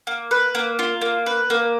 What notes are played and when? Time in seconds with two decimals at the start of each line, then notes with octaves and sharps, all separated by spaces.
0.07 A#3
0.31 B4
0.55 A#3
0.79 F4
1.01 A#3
1.26 B4
1.50 A#3